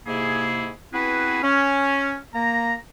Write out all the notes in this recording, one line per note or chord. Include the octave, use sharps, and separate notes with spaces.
G#2 C3 A#3 E4 G#4
B3 C4 E4 F#4 G#4 B4
C#4
A#3 A#5